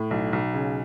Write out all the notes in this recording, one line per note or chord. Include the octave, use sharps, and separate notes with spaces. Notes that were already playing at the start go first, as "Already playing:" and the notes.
Already playing: A2
B1
B1
C#3